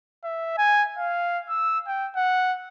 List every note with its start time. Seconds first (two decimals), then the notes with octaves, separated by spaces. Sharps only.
0.24 E5
0.58 G#5
0.98 F5
1.49 E6
1.87 G5
2.16 F#5